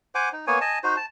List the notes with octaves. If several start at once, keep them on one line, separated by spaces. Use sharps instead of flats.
C5 F#5 G#5 D6
D#4
A#3 B3 C#5 G#5
D#5 G#5 A5
D#4 F#4 C5
A5